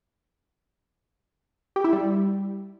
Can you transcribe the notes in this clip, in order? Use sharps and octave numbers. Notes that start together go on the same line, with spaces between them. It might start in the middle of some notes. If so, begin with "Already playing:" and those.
G4
E4
G3